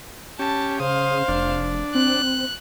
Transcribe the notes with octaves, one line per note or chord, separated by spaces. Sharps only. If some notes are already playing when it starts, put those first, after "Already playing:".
C#4 G4 A5
C#3 C5 F5 D#6
F1 D4
C4 F#6